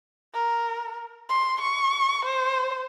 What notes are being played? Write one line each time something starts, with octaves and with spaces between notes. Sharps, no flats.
A#4
C6
C#6
C5